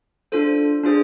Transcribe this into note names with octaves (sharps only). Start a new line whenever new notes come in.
D4 F4 A4 C5
D4 F4 G#4 C5